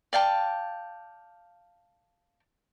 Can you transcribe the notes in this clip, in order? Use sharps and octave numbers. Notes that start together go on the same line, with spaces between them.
D5 F5 G5 A5